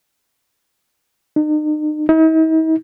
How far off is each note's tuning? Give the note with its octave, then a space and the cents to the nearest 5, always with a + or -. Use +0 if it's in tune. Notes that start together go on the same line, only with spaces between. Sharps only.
D#4 -40
D#4 +45